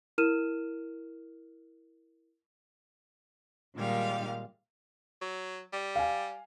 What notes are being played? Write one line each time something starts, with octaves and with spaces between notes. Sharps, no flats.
E4 A#4 F6 D#7 E7
A#2 D#3 G3 G#3 F5
F#3
G3
F5 G#5